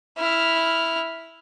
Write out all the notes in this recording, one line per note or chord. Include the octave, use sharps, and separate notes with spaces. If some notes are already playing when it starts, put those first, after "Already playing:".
E4 F6